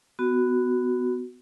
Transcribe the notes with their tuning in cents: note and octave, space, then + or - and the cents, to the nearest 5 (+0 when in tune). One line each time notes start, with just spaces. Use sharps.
B3 +20 F#4 +0